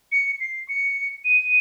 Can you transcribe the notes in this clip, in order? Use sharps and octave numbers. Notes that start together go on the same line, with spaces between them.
C#7
C7
C#7
D#7